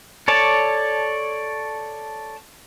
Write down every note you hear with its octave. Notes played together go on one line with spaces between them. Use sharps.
A4 C#5 D5 A5